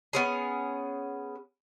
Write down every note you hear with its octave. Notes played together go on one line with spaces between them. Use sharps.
B3 C#4 G#4